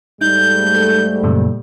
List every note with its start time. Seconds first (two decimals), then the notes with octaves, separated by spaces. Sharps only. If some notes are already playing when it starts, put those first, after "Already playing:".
0.21 G#2 G3 A3 D#4 G6
0.75 A4
1.23 F#2 A#2 C#3